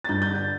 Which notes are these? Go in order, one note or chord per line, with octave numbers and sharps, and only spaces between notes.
A6
G2 G6
G6
D3
A6